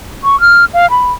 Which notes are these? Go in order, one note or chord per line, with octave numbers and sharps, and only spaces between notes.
C#6
F6
F5
B5